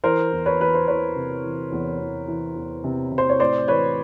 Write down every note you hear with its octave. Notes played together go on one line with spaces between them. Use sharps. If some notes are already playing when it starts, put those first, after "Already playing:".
E3 A#4 C5
E2
B4 C#5
E3 B4
C5
E3 B4 C#5
C3
E3
E2
E2
E3
E2
C3
C3
C5
C#5
A2 C5 D5
E3 B4 C#5